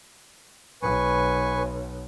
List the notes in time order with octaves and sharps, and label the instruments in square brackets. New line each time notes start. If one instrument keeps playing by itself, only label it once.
[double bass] B1 [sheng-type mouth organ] B4 G#5 C#6